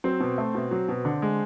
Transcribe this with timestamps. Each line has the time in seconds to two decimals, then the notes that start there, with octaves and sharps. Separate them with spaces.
0.04 F#3 C4 C5
0.20 B2
0.38 A3
0.54 B2
0.71 F#3
0.88 B2
1.05 D3
1.22 G#3